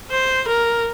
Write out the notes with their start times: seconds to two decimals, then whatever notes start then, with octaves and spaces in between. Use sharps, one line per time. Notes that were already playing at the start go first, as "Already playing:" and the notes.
0.11 C5
0.48 A#4